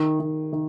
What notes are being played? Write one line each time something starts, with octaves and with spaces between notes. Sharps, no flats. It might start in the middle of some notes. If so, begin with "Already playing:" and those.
Already playing: D#3
D#3
D#3